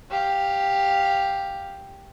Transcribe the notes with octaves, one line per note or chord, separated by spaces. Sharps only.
G4 F5